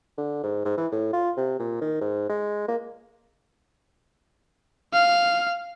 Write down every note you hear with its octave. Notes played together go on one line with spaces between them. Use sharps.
D3
G#2
G#2
E3
A2
F4
C3
A#2
D#3
G#2
G#3
A#3
F5